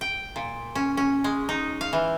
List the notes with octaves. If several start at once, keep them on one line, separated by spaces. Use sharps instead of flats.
G5
A#2
C#4
C#4
G#3
D#4
F5
E3